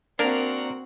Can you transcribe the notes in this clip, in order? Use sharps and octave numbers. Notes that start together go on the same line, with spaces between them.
A#3 C4 D4 F#4 A#4